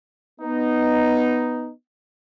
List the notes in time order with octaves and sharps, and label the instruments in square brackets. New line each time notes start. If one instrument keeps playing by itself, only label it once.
[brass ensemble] B3 D#4